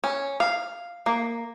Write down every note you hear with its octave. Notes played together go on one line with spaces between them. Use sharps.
C#4
F5
A#3